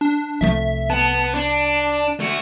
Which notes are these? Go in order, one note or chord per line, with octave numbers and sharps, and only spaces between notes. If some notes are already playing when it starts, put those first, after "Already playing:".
D4
C2 F3 A3 E5
B3 A5
D4
A3 F#4